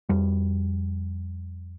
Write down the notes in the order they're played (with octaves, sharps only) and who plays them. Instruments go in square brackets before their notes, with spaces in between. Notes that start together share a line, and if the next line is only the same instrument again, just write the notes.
[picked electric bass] F2 G3